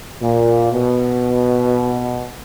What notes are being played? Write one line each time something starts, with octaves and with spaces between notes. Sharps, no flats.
A#2
B2